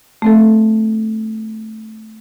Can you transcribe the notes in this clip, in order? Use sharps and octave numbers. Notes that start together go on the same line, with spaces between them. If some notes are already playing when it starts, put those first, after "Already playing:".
A3 C4 A4